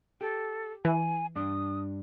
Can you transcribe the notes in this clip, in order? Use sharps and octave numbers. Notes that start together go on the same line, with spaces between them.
G4 A4
E3 G#5
G2 D4 D#6